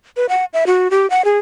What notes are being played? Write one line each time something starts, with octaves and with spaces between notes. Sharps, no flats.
B4
F#5
E5
F#4
G4
F#5
G#4